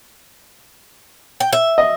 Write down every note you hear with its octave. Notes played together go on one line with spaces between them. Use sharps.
G5
E5
D#5